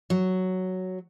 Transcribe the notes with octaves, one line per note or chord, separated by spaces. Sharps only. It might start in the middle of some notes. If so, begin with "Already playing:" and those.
F#3